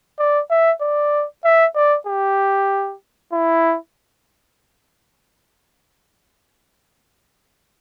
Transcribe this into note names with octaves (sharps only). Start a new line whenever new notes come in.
D5
E5
D5
E5
D5
G4
E4